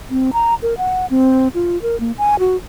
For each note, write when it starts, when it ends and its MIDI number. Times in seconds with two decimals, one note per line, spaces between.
0.10 0.31 60
0.33 0.54 82
0.62 0.77 70
0.78 1.06 78
1.10 1.48 60
1.54 1.81 65
1.82 1.98 70
2.00 2.12 58
2.18 2.39 80
2.39 2.56 66